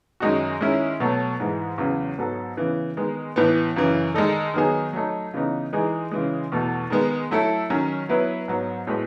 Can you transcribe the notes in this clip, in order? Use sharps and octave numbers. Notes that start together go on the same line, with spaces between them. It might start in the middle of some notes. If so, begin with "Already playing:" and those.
F#2 D#3 G#3 D#4 F#4
D#3 G#3 C#4 E4
B2 F#3 A3
G#2 E3 G#3
E2 C#3 F#3
G#2 F#3 B3 F#4 A4
C#3 E3 B3
D#3 G#3 B3
A2 E3 B3
F#2 C#3 E3
D#3 G#3 D#4 A4
D#3 F#3 B3 D#4 G#4
F#3 A3 D#4
C#3 E3 B3 D#4
E3 G#3 D#4 G#4
C#3 E3 G#3
E2 B2 A3
D#3 G#3 B3
F#3 A3 E4 A4
D#3 F#3 C#4
F#3 B3 E4 B4
G#2 F#3 B3
A2 G#3 B3 F#4 B4